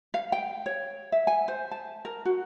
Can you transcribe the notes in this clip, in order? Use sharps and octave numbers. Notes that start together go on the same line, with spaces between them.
F5
G5
C#5
E5
G#5
C5
A5
A#4
F#4